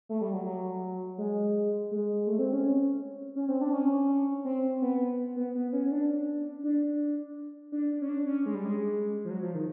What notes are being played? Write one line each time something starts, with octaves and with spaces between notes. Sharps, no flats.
A3
G3
F#3
F#3
G#3
G#3
A3
C4
C#4
C#4
C4
D4
C#4
C4
B3
B3
B3
C#4
D4
D4
D4
C#4
D4
C#4
G#3
G3
G#3
F3
F#3
F3
D#3